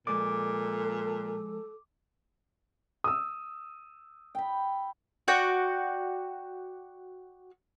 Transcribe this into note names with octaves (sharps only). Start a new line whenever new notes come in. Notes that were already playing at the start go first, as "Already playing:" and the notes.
A#2 F3 G#3 A4 D5 D6
D#6 E6
G5 B5
F#4 D5 G5